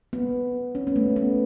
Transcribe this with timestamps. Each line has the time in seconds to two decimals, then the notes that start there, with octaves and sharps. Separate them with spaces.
0.13 B3
0.75 C#4
0.87 B3
0.96 A3
1.16 B3